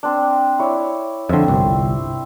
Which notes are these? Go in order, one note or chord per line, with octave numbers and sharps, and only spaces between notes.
C4 D4
E4 C#5 D5
F2 D3 C4 E5
G1 C2